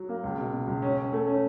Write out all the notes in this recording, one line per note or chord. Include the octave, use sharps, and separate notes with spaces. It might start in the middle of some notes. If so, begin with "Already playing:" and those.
Already playing: F#3
A#3
C#2
B2
B2
C#2
C#4
C#4
A3
C#4